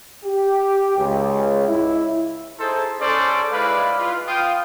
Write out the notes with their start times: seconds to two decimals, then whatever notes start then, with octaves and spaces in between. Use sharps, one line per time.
0.24 G4
0.97 C#2
1.68 E4
2.59 D#4 E4 G#4 A4 C5
3.01 C#4 G#4 A4 C5 D5
3.52 G#3 D#4 E4 B4 D5 F5
3.98 F4 B4
4.27 F4 G5 D#6